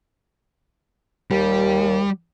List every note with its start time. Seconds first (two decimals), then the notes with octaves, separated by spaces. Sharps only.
1.31 D#2 G3